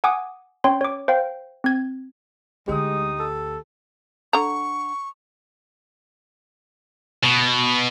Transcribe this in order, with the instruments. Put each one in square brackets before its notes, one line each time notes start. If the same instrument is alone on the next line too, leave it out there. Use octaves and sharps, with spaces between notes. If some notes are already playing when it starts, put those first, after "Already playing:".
[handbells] F#5 G#5 D6 D#6
C#4 C#5 G5 C6
C#5 D6
C5 F5 G5
C4 G#6
[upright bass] D2 D3 [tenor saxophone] G#3 [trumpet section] D#4 D#6 [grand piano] G4
[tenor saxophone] A4
[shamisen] D3 A#5 [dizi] C#6
[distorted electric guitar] B2